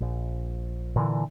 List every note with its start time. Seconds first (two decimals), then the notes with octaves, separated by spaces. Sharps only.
0.01 A#1
0.96 A#2 D3 E3